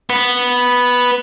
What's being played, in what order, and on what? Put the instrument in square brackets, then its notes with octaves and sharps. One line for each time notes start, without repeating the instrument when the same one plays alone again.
[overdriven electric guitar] B3